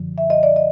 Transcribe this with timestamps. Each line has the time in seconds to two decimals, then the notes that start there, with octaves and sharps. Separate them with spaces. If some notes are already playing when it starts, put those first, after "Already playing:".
Already playing: F#2 D3 F3
0.18 E5
0.30 D#5
0.43 D5
0.56 D#5